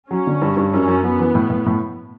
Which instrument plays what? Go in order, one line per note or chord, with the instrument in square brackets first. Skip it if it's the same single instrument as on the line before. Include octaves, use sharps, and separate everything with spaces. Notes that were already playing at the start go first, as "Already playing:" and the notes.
[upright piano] F#3 [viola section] C#4
[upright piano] D3
G2
G2
[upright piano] F#2 [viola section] C#4
[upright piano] F#2
[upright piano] F#2 [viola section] B3
[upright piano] E3
A2
A2
A2